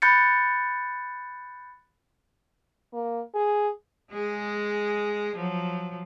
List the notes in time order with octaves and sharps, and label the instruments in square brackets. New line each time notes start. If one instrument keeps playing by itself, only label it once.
[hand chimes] B5 F#6 G6 A6 C#7
[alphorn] A#3
G#4
[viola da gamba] G#3 G#4
F3 F#3